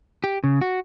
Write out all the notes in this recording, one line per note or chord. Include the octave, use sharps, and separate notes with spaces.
G4
C#3
F#4